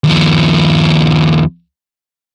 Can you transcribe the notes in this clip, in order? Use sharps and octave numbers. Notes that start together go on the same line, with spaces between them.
D#2 F3